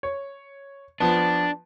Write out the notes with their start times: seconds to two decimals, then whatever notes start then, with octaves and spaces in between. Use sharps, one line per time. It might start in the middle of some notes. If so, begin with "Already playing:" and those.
0.03 C#5
1.00 F3 B3 D4 A5